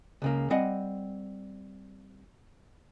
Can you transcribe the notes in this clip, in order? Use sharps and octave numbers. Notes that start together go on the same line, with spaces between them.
C#2 C#3 A#3
G3 C4 D#5 F#5 G#5